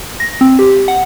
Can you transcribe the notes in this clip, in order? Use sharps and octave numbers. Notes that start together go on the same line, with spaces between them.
A#6
C4
G4
F#5